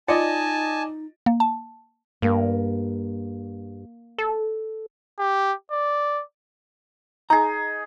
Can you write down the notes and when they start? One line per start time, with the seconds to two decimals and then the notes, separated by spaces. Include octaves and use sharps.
0.08 D#4 F4 D5 D#5 G#5 A5
1.26 A#3
1.40 A5
2.22 G2 A#3
4.18 A4
5.19 G4
5.71 D5
7.30 D#4 G#4 A#5